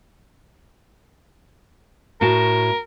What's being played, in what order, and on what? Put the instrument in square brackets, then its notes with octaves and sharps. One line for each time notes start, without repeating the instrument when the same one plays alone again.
[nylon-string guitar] A2 F#4 A5 [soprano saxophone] A#4